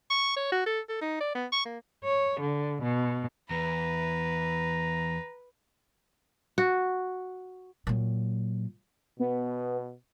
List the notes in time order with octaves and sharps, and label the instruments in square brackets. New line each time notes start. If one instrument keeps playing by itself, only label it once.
[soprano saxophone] C#6
C#5
F#4
A4
A4
D#4
D5
B3
C#6
A#3
[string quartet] C#5
D3
B2
[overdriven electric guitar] E2 [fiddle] B4 [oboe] A#5
[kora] F#4
[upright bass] A#2 F#3
[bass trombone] B2 [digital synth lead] B3